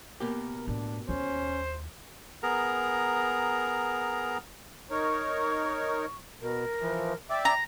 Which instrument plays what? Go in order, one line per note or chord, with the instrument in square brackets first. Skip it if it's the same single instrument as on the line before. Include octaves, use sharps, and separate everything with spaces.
[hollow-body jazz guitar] B2 A#3 G4 [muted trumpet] A#4
[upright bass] A2 [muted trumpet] D4
[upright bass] D#2 [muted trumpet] C#4 [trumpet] C5
[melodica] B3 G#4 A#4 A#5
[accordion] D#4 A#4 C#5 [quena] C#6
[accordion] B2 [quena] A#4
[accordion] E3 F3
[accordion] D5 E5 D6 [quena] G5
[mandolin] A#5